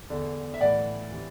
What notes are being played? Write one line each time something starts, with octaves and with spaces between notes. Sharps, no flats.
E2 D3
E5
A2 E3 D5 F#5
C3 E3